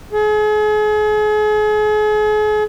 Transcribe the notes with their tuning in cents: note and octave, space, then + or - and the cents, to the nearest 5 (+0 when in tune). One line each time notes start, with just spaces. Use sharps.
G#4 +40